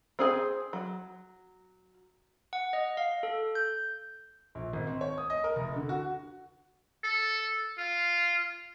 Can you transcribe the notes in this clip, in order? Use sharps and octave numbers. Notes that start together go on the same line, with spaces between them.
C4 G#4 G#5
F#3
F#5
D#5
F5
A4
G6
A#1
G#1
C4
C#5
D#6
D#5
A#4
F1
D3
F#4
A4
F4